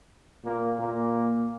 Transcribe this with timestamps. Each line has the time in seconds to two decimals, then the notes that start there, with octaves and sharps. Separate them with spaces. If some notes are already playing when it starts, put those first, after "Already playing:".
0.44 A#2 A#3
0.78 A#2 A#3